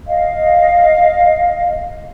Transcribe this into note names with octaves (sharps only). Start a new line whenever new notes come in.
D#5 F5